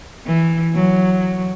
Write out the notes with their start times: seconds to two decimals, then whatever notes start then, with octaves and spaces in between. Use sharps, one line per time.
0.27 E3
0.75 F#3